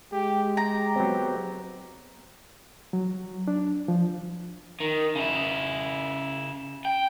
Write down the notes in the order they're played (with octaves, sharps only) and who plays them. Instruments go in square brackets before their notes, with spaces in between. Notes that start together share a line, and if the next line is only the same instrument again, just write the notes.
[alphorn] G#3 [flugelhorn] G4
[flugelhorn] G4 [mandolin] A#5
[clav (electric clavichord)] F#3 B3 C4
[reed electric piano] F#3
D4
F3
[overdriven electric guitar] D#3
C#3 E4
G5